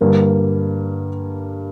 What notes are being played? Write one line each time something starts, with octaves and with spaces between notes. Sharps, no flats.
G2 D3 G3 A#3